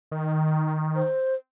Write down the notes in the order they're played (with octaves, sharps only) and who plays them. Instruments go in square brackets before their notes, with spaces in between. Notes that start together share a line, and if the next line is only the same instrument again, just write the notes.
[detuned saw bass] D#3
[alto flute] C5